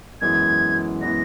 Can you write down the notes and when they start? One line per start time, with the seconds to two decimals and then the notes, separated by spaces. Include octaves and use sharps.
0.21 F#2 E3 G#3 B3 G#6
1.01 E3 G#3 B3 A#6